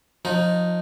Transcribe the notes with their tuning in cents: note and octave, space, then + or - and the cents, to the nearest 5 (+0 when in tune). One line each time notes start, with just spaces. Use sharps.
F3 +25 D#4 +0